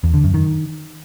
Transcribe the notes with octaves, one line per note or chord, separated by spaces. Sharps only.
E2
D3
F#2
D#3